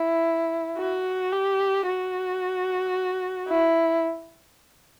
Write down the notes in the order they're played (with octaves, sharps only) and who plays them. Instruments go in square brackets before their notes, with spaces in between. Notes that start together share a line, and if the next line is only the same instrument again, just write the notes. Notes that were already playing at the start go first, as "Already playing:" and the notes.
Already playing: [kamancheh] E4
F#4
G4
F#4
E4